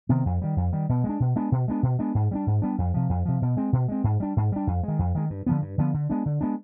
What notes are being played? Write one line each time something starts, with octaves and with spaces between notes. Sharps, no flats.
C3 D#3 B3
F2
D#3 G3
F2
D#3 G3
B2
G#3 B3
D4
B2
G#3 B3 D4
B2
G#3 B3 D4
B2
G#3 B3 D4
G#2
G3 B3 D4
G#2
G3 B3 D4
F2
C3 F3
F2
C3 F3
B2
G#3 C4
B2
G#3 C4
G#2
G3 D4
G#2
G3 D4
F2
D#3 G#3
F2
D#3 G#3
G2
D3 F3 B3
G2
D3 F3 B3
D3
G#3 B3 D4
D3
G#3 B3 D4